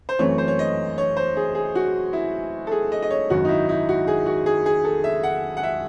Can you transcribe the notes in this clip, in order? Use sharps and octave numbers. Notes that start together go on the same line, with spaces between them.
C5
F#2 E3 A3 C4 C#5
C5
C#5
D#5
C#5
C5
G#4
G#4
F#4
E4
A4
G#4
D#5
D#5
C#5
G#1 F#2 D#3 F#4
D#4
E4
E4
F#4
G#4
F#4
G#4
G#4
A4
E5
F#5
F#5
E5